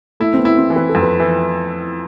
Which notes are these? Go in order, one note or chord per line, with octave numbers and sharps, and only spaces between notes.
A3 E4
C4
B3
E4
C4
E3
B4
A4
F2
B4
E3